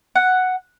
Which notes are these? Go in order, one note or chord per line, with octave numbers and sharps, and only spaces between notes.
F#5